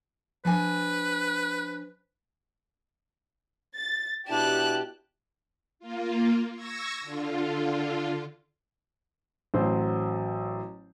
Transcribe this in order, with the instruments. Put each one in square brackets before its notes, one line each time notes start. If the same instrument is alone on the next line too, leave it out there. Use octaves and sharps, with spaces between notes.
[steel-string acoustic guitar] F3 D4 G#5 [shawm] B4
[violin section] A6
[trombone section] B2 D4 E4 [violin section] G4 [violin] A5 F#6
[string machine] A#3 F4
C#6 E6 G#6 A#6
D3 F4
[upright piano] A1 F#3 C5